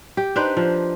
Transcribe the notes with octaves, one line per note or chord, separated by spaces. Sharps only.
G4
D4 D#4 B4 C5
F3